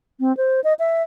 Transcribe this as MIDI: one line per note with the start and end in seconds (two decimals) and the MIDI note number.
0.20 0.35 60
0.37 0.61 72
0.64 0.74 75
0.79 1.02 76